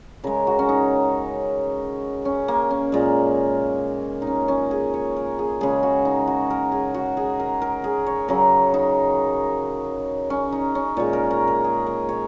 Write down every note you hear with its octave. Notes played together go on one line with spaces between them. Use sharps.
C#3 G#3 A#4
F#4
C#4
D#4
C#4
A#3
C#4
A#2 G#3
D#4
C#4
C#4
G#4
C#5
A#4
G#4
C#3 G#3 G#4
F#4
D#4
F#4
A#4
G#4
F#4
G#4
A#4
A#4
G#4
C#5
C#3 F#3 A#4
D#4
C#4
D#4
C#4
A#2 G#3 C#5
A#4
A#4
A#4
G#4
A#4
C#5